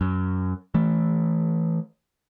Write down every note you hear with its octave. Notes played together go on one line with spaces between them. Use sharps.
F#2
E3 A3